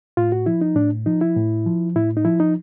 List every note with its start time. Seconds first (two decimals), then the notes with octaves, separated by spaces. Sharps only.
0.17 A2 F4
0.32 F#4
0.46 F3 E4
0.61 D#4
0.76 A2 D4
1.06 F3 D#4
1.21 E4
1.36 A2
1.66 F3
1.96 A2 E4
2.17 D#4
2.25 F3 E4
2.40 D#4